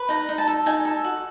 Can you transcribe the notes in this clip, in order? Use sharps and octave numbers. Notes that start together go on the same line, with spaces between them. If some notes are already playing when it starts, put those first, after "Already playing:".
Already playing: B4
D#4 A#5
D#4
A5
A4
D#4 G#5
A4
F#4